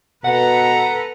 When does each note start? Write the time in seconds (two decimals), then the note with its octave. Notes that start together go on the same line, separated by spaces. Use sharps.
0.25 B2 A4 B4 F#5 A#5